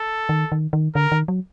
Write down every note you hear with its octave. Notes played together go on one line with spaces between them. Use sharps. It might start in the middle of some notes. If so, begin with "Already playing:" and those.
Already playing: A4
D#3
D#3
D#3
D3 A#4
D#3
F#3